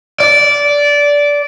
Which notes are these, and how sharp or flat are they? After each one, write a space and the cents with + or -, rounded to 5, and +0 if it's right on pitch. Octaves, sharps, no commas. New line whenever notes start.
D5 -15